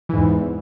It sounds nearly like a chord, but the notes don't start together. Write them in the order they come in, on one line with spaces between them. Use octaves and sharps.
E3 G#2 E2